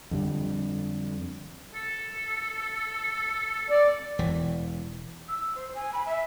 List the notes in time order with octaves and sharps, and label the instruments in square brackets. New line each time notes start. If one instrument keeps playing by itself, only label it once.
[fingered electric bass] F2 D3 G3
[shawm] A4
[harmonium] D5
[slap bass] E1 E3
[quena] E6
C5
G#5
B5
E5